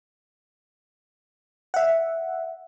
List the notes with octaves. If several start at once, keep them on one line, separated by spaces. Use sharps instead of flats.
E5 F#5